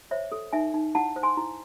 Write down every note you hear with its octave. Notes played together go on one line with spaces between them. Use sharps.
C5 C#5 E5
A4
D#4 E5 G#5
D#4
E4 F#5 A5
C5
G#5 C6
E4